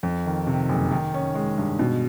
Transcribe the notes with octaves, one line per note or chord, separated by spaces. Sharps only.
F2
D#3
C3
F#1
D#3
C#4
G#3
G2
B2